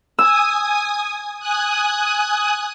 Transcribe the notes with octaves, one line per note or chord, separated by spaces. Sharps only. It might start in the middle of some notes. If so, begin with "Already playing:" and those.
G#5 D#6 E6
G#5 D#6 F#6